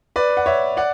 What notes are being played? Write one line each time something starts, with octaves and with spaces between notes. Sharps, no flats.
B4 D5
F#5
C#5 E5
D5 F#5